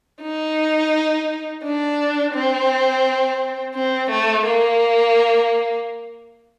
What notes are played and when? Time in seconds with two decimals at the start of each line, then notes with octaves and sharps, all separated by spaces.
0.22 D#4
1.63 D4
2.34 C4
3.75 C4
4.10 A3
4.45 A#3